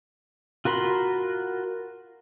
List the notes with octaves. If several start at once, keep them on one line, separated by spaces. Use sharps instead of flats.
F4 F#4 A#4 B5 C6